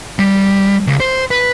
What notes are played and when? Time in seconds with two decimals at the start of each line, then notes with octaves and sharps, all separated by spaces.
0.19 G3
0.87 C#2
1.00 C5
1.31 B4